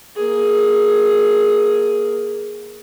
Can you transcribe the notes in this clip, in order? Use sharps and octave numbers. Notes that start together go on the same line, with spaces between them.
A#3 G#4